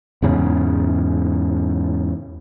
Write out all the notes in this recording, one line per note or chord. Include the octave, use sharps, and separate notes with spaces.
E2 G#2 C#3